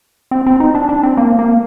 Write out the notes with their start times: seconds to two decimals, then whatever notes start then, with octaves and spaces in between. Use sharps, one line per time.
0.31 C4
0.47 C4
0.60 D#4
0.75 D4
0.89 D4
1.03 C4
1.17 A#3
1.39 A#3